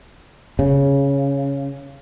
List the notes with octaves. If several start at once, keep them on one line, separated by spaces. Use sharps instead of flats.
C#3